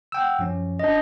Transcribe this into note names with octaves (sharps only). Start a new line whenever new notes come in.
F#5 G5 E6
F#2 F3 C#4
D4 D#5